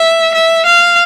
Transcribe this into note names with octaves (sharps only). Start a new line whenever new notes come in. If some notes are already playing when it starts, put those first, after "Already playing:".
Already playing: E5
E5
F5